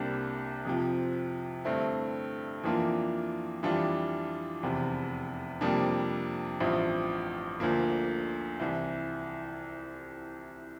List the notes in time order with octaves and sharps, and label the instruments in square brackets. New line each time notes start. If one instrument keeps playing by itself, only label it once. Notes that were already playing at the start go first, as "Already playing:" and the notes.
Already playing: [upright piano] C2 C3 G3 A#3 D4
F2 C3 F3
G2 D3 A3 C4 E4
F2 E3 A#3 D4 F4
F2 E3 G3 D4 F4
F1 E2 C3
F2 C3 G3 A#3 D4
A1 G2 F3 C4 E4
D2 D3 F3 A#3
C2 C3 E3